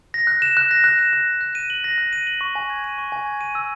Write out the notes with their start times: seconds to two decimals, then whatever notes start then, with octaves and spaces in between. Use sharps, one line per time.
0.14 A#6
0.27 F#6
0.42 E7
0.57 F#6
0.71 A#6
0.84 F#6
0.99 E7
1.13 F#6
1.27 A#6
1.41 F#6
1.55 D#7
1.70 F#7
1.84 A#6
1.98 F#6
2.13 D#7
2.27 F#7
2.41 C#6
2.55 G#5
2.70 G#6
2.84 D#7
2.98 C#6
3.12 G#5
3.26 G#6
3.41 D#7
3.55 E6